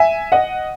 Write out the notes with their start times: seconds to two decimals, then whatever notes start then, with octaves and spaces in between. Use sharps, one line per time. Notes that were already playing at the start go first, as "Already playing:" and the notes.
Already playing: E5 G#5
0.32 D#5 F#5